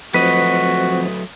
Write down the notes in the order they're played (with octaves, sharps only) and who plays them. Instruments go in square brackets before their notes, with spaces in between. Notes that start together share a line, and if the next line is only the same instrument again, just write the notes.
[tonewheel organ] F3 C4 [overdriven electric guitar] F#3 A3 [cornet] F#4 [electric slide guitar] B4 D#5